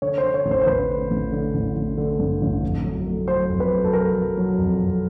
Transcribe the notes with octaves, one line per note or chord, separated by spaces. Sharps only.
D3 C#5
C5
D3
C#5
A1
C5
C5
A1 B4
D3
A1
D3
A1
A1
D3
G2
A1
F2
F#3
A3
F#3 C5
F2
B4
F#3
A4
F#3 A#4
F#3
F#3
F2
F2